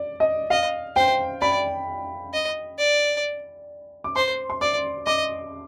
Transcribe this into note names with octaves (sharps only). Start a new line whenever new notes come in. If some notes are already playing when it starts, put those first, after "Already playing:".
Already playing: D5
D#5
D#5 F5
C5 G5
D5 B5
D#5
D5
D6
C5 C6
C6
D5 D6
D#5 D6